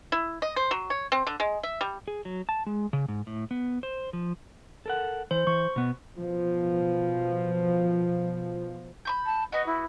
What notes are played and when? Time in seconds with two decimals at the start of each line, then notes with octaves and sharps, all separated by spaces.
0.12 E4
0.42 D#5
0.56 C5
0.71 F#3
0.90 C#5
1.12 C4
1.27 D3
1.40 G#3
1.63 E5
1.81 G3
2.08 G#4
2.25 F#3
2.49 A5
2.66 G#3
2.93 C#3
3.08 G#2
3.27 A2
3.51 B3
3.83 C5
4.13 F3
4.86 A4 A#4 F#5
5.31 E3 C5
5.47 E3 C#6
5.76 B2 B3
6.18 B2 F3
9.05 B5 C#6 G6
9.26 A5
9.52 B3 F#4 D#5
9.66 E4